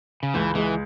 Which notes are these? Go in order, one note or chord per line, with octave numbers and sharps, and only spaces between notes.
C#3
C#2 E3
E3 G#3